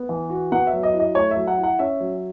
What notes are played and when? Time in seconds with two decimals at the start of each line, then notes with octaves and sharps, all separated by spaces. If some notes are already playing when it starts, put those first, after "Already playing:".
Already playing: B3
0.09 E3
0.30 F#4
0.52 B3 F#5
0.67 E5
0.73 F#3
0.83 D#5
0.93 E4
1.00 D#5
1.15 A3 C#5
1.31 E5
1.36 F#3
1.47 F#5
1.58 E4
1.63 F#5
1.79 C#4 E5
2.00 F#3